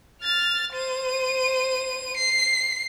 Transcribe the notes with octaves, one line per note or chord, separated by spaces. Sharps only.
F6 A6
C5 D#7
C7